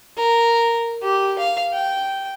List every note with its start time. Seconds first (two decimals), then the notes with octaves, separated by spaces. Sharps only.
0.17 A#4
1.02 G4
1.38 F5
1.73 G5